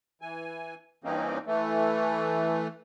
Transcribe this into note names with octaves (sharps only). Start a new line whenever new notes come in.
E3 G#5
G2 E3 A#3 C4 C#4 D#4
E3 A3